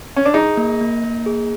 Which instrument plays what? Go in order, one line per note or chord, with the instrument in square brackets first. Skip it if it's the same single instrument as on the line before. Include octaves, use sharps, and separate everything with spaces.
[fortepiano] C#4
D4
[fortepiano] D#4 [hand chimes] G#4
[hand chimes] A#3
A#3
A#3
G#4